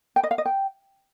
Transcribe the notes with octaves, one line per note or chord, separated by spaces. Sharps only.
G5
D#5
F5
D#5
G5